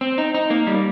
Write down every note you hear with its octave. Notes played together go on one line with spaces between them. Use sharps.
C4
D#4
D#4
A#3
G3